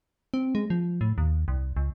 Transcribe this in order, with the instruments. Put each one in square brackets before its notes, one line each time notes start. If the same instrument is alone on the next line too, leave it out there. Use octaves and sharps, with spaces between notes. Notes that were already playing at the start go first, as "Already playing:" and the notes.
[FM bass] C4
G#3
F3
A2
D#2
C2
C#2